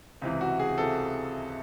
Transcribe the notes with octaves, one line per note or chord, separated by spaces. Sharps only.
C#2 C3 E3
F#4
G#4
C3 E3 A4